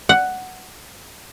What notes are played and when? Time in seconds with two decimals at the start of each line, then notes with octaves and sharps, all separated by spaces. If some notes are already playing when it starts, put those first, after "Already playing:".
0.09 F#5